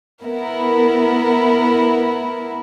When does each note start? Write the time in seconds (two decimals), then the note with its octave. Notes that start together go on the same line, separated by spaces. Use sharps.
0.24 B3 E4 A#4